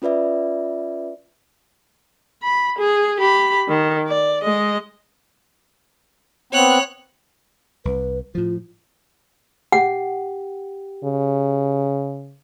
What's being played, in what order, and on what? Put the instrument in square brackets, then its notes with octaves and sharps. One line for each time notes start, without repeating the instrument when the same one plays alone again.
[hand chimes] C#4 F4 B4 D5 E5
[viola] B5
G#4
G4 B5
D#3
D5
G#3 D#5
[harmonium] B3 C4 [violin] C#5 F#6
[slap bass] C2 [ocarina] B4
[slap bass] A2 F3 [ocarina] F4
[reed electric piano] G4 [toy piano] F#5
[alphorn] C#3